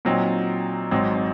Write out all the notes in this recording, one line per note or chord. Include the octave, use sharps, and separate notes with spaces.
A#2 F#3 C4 D#4
G#1 G#2 F#3 C4 D#4